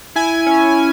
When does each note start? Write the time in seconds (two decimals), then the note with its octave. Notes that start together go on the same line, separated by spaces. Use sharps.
0.16 E4 G#5
0.46 C#4